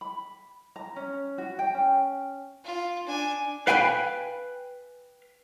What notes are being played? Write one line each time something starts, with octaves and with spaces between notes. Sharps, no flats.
B5
A#5
C#4
F#4
G5
C#4
F4
D4 G#5
B4 F5 G5 G#5 A#5 B5